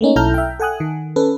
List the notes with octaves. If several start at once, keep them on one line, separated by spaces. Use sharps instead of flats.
A3 A#3 C#4 D#4
B1 E4 A4 A#5 F6 G6
E5 G5
A4 F#5 G#5 D#6 F#6
D#3
C#4 A4 B4